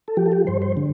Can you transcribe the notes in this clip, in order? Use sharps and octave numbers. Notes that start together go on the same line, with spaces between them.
A4
F3 G4
A4
G4
G2 C5
C5
D3